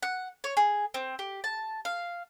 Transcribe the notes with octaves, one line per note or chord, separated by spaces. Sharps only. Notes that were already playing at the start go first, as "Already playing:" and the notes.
F#5
C#5
G#4
C4
G4
A5
F5